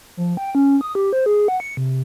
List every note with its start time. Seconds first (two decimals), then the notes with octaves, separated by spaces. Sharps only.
0.17 F3
0.37 G5
0.55 C#4
0.81 D#6
0.95 G4
1.13 C5
1.26 G#4
1.48 F#5
1.60 C#7
1.77 C3